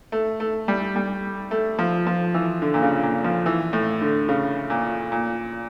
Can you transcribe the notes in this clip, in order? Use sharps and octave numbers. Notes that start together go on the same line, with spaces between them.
A3
A3
G3
G3
A3
F3
F3
E3
D3
A#2
C#3
A#2
F3
E3
A2
D3
C#3
A#2
A#2